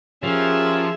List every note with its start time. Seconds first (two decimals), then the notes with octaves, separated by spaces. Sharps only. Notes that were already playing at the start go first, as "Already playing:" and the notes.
0.23 F3 C#4 G4 G#4 A#4 E5